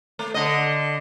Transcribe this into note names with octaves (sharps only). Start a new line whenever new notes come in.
A3
D3 D#5